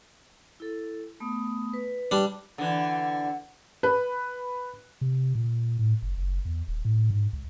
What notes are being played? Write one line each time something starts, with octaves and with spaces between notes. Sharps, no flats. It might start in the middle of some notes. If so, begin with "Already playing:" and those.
E4 A4
A3 B3 D#6
B4
G3 D4
D3 E3 F#5
B4
C3
A#2
A2
F#1
F#1
E2
D#1
A2
G#2
C#2